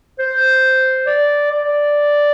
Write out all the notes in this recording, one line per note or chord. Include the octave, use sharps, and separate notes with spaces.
C5
D5
D5